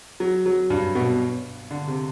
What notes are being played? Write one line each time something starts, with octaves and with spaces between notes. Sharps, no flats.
F#3
F#3
G2
B2
D3
C3